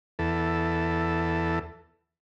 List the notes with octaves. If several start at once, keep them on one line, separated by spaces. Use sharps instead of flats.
E2 A4